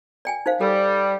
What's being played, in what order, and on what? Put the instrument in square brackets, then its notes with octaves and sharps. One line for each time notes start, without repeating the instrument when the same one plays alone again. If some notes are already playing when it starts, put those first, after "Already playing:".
[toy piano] D5 G5 G#5
D#4 C5 F5
[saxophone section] G3 [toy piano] A4